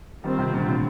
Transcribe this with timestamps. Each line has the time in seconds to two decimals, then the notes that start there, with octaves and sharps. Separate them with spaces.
0.24 D#3 G3 C4 F4 C5
0.38 C3 D#3
0.53 A#2 D3
0.68 A2 C3